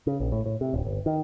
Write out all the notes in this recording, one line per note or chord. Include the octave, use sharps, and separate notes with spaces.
C#3
A#1
A2
A2
C3
D1
G1
D#3